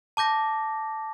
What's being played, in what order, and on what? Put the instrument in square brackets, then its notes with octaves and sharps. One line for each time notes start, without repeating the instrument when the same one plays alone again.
[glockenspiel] A5 D6 G6 A#6